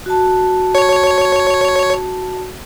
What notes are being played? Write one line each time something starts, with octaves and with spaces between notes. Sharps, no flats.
F#4 A5
C#5